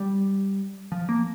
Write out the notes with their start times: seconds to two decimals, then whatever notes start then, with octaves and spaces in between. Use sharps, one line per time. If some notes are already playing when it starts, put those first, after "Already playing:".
Already playing: G3
0.92 F3
1.09 A#3